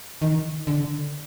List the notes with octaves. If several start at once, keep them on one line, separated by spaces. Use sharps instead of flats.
D#3
D3